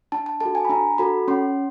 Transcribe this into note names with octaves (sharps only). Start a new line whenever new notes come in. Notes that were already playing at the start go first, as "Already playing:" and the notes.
D4 A5
A5
F#4 A4 A5
G#5
B5
D4 A#5
F#4 A4 B5
C#4 C6